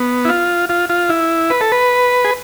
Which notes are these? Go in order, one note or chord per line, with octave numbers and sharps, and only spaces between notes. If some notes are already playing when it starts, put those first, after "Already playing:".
Already playing: B3
E4
F4
F4
F4
E4
B4
A4
B4
G#4